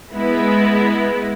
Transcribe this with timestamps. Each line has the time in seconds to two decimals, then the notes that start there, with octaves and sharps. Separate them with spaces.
0.14 G#3 B3 E4